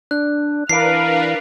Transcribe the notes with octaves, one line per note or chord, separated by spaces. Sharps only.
D4 F#6
E3 D4 A#4 B4 F5 C7 D7